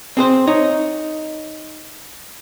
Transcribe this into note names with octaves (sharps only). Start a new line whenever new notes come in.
C4 G#4 C5
D#4 C#5